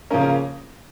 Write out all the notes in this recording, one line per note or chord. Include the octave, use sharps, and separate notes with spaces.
C#3 F3 A#3 C#4 A#4
A#4